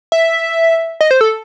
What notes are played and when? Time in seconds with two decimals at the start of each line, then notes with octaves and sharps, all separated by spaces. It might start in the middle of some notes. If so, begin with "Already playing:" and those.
0.12 E5
1.01 D#5
1.11 C5
1.21 A4